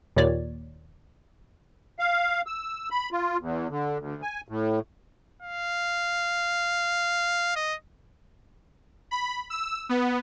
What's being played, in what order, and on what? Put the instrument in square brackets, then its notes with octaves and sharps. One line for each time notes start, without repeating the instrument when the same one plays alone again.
[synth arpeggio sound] D#2 A#2 D#3 C#5 D5
[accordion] F5
E6
B5
F4
E2
D3
D2
G#5
A2
[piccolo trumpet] F5
D#5
[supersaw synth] B5
E6
B3